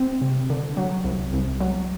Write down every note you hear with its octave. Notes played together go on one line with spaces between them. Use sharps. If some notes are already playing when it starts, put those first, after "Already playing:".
Already playing: C4
C3
D3
F#3
C2
C2
F#3